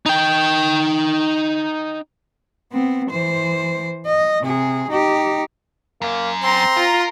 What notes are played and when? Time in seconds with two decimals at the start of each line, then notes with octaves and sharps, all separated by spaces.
0.06 D#4 G5
2.72 B3 C4
3.10 E3 C5
4.06 D#5
4.42 C3 G#4
4.90 D#4 G4
6.02 F#2 A#3
6.43 C4 A#5 C6
6.77 F4 A#4